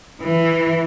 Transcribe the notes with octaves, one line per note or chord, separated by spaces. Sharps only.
E3